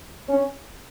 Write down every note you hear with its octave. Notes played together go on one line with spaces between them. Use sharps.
C#4